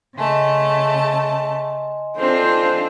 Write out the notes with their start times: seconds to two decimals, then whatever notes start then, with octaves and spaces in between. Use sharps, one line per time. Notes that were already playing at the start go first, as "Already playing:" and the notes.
0.17 C#3 A3 D#5 G#5 A5 C6
2.18 C4 D4 F4 A4 C5